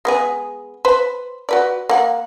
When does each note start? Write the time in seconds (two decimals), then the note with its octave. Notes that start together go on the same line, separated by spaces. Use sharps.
0.05 G#3 B3 G#4
0.85 B4 C5
1.49 F#4 B4 D5
1.89 A#3 F#5